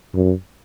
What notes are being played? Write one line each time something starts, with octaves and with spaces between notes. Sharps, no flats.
F#2